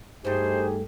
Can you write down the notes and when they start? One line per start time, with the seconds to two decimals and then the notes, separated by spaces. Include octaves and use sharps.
0.25 G2 A3 D#4 G4 G#4 C5